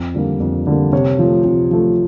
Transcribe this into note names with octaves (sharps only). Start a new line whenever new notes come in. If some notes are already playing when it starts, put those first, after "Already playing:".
Already playing: F2
D3 G3 A#3
F2
D3 G3 A#3
C3 C#5
F3 A3
C3
F3 A3